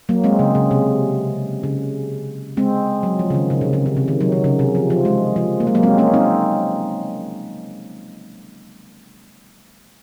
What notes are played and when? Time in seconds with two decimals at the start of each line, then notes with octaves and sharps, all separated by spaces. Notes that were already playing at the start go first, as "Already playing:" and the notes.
0.09 F#3 A#3
0.24 G#3 C4
0.39 C#3
0.55 C#3
0.71 C3
1.63 C#3
2.57 G#3 C4
3.03 F#3
3.19 F3
3.30 C#3
3.35 D#3
3.50 C#3
3.61 C3
3.73 C#3
3.86 C#3
3.97 C3
4.08 D#3
4.21 F#3
4.32 D#3
4.44 C#3
4.59 C3
4.75 F3
4.90 F3
5.05 G#3
5.36 F3
5.60 A#3
5.67 G#3
5.75 F#3 A#3
5.83 G#3 C4
5.98 A#3 C#4
6.14 C4 D#4